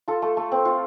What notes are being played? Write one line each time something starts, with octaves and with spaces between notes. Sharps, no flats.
F4 A4
A3
A3
C4
F4